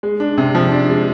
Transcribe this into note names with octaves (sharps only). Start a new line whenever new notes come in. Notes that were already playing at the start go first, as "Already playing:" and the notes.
G#3
D4
C3
F3
D4
G#3